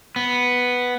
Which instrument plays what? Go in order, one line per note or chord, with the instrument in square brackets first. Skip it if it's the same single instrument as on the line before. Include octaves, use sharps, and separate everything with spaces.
[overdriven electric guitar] B3